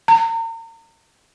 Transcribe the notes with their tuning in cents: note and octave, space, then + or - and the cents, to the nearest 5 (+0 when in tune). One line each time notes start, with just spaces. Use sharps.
A#5 -40